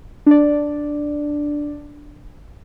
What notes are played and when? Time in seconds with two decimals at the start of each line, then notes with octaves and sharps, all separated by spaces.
0.26 D4 D5